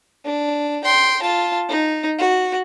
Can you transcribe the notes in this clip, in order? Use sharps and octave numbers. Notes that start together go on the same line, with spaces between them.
D4
G5 C6
F4 A5
D#4
F#4